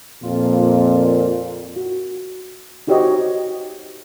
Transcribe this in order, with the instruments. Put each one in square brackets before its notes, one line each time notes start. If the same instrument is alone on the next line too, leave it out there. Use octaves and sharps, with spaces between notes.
[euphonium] F2 [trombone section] A#2 [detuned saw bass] F4
[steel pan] F#4
D#4 F#4 G4 C5 C#5 D#5